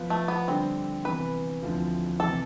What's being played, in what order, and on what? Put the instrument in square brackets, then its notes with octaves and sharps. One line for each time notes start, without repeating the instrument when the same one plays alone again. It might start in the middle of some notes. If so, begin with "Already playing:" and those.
Already playing: [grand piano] F3 B3 F4 B4
[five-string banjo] A3
B3
[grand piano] D3 G3 D4 [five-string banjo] C4
[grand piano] C3 E3 B3 [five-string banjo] B4
[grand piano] D2 D3 F3 C4 E4
[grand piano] C3 E3 A3 [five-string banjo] A4